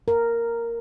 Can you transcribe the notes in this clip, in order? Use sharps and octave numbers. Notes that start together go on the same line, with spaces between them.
A#4